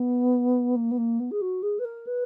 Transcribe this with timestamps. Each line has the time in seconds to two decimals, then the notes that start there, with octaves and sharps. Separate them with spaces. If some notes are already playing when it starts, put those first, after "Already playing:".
Already playing: B3
0.75 A#3
0.91 B3
0.98 A#3
1.20 B3
1.31 G#4
1.41 F#4
1.62 G#4
1.79 B4
1.85 A#4
2.07 B4